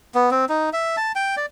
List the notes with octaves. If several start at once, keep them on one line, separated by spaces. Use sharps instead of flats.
B3
C4
D#4
E5
A5
G5
D5